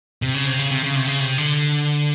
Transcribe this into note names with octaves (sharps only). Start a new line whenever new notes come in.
C3
C#3
C3
C#3
C3
C#3
C3
C#3
C3
D3